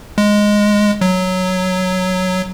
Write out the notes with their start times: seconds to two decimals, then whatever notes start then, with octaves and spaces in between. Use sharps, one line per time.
0.18 G#3
1.01 F#3